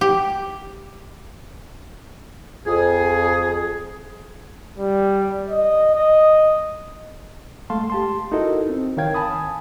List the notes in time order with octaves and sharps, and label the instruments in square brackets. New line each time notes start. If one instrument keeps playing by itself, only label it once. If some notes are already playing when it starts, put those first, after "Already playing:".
[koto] G4
[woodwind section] F2 G#4
[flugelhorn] G3
D#5
D#5
[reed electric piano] G#3 A3 F5 A5 C6
G4 A5 C6
D#4 E4 F#4 A4 A#4 D#5
C4
D#3 A#4 C#5 F5 G5 G#6
G#5 A5 B5 D#6